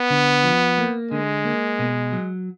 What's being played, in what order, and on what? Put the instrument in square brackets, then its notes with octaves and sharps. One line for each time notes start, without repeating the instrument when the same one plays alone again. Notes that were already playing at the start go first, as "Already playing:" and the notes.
Already playing: [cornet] B3
[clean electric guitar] D3
F3
A#3
[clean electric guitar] D3 [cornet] G#3
[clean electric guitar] A#3
B2
F#3